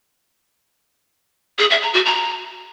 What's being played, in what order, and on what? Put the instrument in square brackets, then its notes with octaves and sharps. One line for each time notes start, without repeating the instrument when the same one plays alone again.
[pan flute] G#4
E5
A#5
F#4
A#5